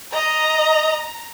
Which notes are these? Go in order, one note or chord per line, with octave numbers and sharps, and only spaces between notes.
D#5 A#5